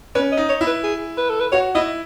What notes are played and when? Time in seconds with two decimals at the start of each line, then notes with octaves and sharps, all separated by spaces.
0.15 C#4 B4
0.32 D#5
0.37 D#4
0.49 C#5
0.61 E4
0.67 B4
0.84 G#4
1.18 B4
1.30 A4
1.40 B4
1.52 F#4 C#5
1.75 E4 D#5